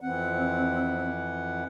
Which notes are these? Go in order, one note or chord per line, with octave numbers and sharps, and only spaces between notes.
F2 E3 C4 F#5